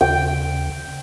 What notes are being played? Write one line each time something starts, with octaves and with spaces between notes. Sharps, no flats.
D#2 C#3 G5